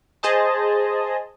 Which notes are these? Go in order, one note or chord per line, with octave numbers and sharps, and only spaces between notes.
G#4 C5 D#5 A5